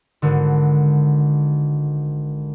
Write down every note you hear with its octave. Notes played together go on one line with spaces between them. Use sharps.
G#1 D3